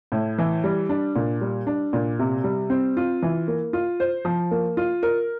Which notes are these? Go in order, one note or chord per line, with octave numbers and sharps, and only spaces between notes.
A2
E3
G3
D4
A#2
G3
D4
A#2
C3
G3
C4
F4
E3
A#3
F4
C5
F3
A#3
F4
A#4